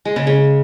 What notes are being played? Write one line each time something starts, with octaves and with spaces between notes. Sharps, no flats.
G#3
C#3
C#3